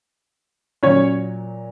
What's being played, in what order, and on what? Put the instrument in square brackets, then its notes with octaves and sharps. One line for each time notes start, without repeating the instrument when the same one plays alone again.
[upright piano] A#2 F#3 C#4 C#5